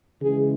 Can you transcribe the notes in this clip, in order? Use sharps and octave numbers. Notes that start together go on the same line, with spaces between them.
C#3 E3 G#3 G#4